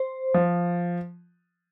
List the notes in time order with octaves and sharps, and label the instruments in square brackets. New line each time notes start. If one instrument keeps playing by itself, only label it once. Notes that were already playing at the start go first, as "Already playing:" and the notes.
Already playing: [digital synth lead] C5
[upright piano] F3